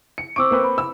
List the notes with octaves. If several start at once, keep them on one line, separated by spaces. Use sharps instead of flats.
C#7
C4 C#6 D6 E6 D7
A#3 C4 B4
B5
E6